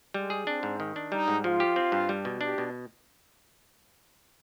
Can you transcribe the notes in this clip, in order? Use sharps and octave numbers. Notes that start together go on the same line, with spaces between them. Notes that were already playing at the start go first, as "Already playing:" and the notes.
G3 G#3
G#4
C4 D4
G#2
D#3
D4
G3 D#4
G#2
F3 F4
G4
C4
G2
G3
B2
D4 G4
B2